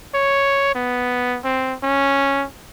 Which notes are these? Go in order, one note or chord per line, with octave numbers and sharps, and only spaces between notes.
C#5
B3
C4
C#4